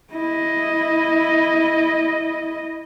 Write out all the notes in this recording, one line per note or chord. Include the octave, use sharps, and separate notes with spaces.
E4 D#5